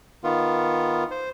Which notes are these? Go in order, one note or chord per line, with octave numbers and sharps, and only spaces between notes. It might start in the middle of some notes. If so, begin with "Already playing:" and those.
D#3 B3 F4
C5